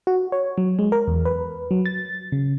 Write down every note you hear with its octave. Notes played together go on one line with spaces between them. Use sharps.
F#4
C#5
F#3
G#3
A#4
E2
B4
F#3
A6
C#3